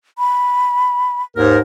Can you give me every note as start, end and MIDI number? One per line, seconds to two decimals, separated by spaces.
0.19 1.22 83
1.36 1.59 39
1.36 1.59 44
1.36 1.59 70